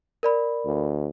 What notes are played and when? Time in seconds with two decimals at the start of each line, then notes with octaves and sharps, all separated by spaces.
0.23 A#4 D5 B5
0.66 D2